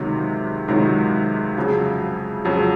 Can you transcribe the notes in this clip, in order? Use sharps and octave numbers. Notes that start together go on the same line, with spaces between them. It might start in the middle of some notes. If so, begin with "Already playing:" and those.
Already playing: C#2 C3 D#3 F#3
C#2 C3 D#3 F#3
F2 C#3 F#3
F2 C#3 F#3